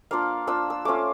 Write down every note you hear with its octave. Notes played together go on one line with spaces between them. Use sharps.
A#3 D4 F4 F5
A#3 D4 F4 E6
E6
A3 C#4 F4 D6